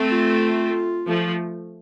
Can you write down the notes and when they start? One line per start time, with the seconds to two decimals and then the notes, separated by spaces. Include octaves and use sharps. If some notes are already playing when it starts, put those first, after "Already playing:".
Already playing: A3 C4
0.12 F4
1.07 F3 A3